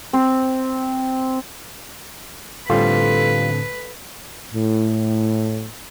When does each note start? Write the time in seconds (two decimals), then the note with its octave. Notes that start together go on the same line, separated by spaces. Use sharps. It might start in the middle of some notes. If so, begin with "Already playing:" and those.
0.13 C4
2.70 A2 D3 G3 C4 F4 A4 B4
4.53 A2